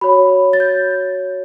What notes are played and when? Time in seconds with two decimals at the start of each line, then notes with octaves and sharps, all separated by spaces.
0.01 F#4 C#5 B5
0.53 A6
0.60 G6